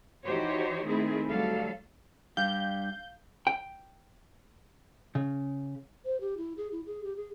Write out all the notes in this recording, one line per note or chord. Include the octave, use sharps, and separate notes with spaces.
E3 D#4 F#4 G4 C5 C#5
D#3 G#3 A3 C4 E4 G#4
D2 F#3 G3 A4 F5
G2 G4 F5 G6
G5
C#3
C5
G4
E4
G#4
E4
G#4
G4
G#4